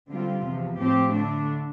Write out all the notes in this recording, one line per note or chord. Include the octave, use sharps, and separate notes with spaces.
D3 G3 C4 F4
E2 C3 F3
A2 F3 C4 G4
D3 A3 D4